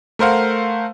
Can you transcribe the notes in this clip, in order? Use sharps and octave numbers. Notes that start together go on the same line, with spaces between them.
A3 A#4 C5 F5 F#5